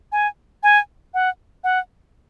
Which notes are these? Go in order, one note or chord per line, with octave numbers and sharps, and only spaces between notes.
G#5
G#5
F#5
F#5